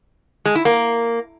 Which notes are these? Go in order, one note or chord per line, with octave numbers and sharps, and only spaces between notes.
G#3
E4
A#3